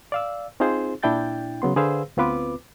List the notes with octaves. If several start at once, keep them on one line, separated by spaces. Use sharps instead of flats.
D5 F5 E6
C4 D#4 F4 G#4 C5
A#2 D4 E4 G5 G6 A6
C#3 F#3 B3 C6
D3 G#4 B4 C5 F5 E6
D2 B3 C4 F4 B4 D6